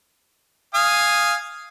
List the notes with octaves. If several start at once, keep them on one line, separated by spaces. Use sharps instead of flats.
F5 G#5 D#6